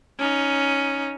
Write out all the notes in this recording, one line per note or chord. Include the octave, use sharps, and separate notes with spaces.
C#4 D#4